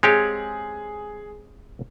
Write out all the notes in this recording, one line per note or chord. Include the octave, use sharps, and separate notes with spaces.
G#3 C4 G4 G#4 C#5 F5